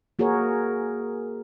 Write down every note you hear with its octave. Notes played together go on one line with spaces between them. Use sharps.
A#3 F#4 G#4 A#4 C#5